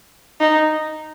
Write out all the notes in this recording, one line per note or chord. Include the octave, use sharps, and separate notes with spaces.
D#4